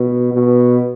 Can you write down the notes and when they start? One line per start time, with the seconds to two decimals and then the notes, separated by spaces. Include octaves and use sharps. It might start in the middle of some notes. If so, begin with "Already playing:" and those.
Already playing: B2
0.34 B2